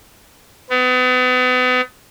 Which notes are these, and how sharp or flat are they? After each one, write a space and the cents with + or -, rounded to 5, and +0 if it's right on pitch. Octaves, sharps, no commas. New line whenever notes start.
B3 +35